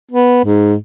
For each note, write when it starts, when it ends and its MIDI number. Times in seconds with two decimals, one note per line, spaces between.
0.12 0.41 59
0.45 0.75 44